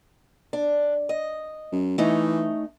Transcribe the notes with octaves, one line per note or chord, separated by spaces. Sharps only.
D4
D#5
F#2
E3 A3 C#4 D#4